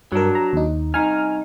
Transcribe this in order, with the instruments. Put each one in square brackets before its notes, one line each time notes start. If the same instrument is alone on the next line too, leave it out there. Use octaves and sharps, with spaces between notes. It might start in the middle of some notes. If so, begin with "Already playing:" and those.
[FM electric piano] G2 A#4 [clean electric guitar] F#3 D4
[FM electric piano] A#5
D#2 D#4
[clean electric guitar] C2 D#4 [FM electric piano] G#5 F6